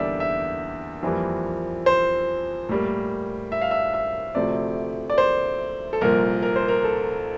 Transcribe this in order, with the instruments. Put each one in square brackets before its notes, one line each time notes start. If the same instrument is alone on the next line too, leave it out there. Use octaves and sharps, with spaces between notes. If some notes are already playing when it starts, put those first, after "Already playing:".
Already playing: [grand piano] E2 D3 G3 A#3 D5 E5
E5
F2 E3 G3 A#3
C5
A2 G3 A#3
E5
F5
E5
E5
D2 C3 F3 A3 D5
D5
C5
A4
C2 A#2 F3 A#3 A#4
A#4
C5
A#4
A4